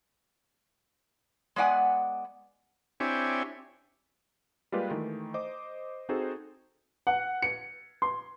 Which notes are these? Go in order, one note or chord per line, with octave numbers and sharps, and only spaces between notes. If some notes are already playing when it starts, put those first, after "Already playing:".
G#3 B3 D5 F#5 G#5
C4 D4 E4 G4 C#5 G#5
G3 G#3 A#3 F4 G4 B4
D#3 E3 A3
C5 D#5 D6
C4 D#4 F#4 G#4 A4 C5
F#5
C#7
C6